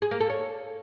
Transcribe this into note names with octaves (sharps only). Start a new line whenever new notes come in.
G#4
A#3
A4
C#5